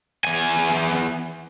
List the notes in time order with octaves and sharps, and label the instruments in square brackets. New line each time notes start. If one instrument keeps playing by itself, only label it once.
[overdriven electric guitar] E2 G#5